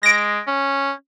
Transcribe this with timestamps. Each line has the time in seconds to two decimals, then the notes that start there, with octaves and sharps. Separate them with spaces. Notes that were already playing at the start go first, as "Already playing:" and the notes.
0.03 G#3 A#6 D7
0.47 C#4